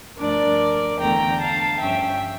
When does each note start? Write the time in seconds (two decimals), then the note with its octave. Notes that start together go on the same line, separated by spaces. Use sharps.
0.18 G2 F3 A3 D4 A#4 D5
1.00 E2 D3 A3 G5 A#5
1.40 F5 A5
1.79 G2 F3 C#4 E5 G5